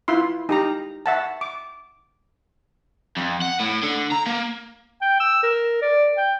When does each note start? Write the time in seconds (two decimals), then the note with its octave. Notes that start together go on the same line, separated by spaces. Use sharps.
0.08 E4 F4 C6
0.49 D#4 G4 A#5
1.06 E5 F#5 A5
1.41 D6
3.17 F2
3.41 F#5
3.60 A2
3.83 D3
4.11 A#5
4.26 A#3
5.02 G5
5.20 E6
5.43 A#4
5.82 D5
6.17 G5